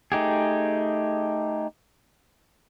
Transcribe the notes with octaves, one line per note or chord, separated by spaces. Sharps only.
A3 D#4 G4 G#4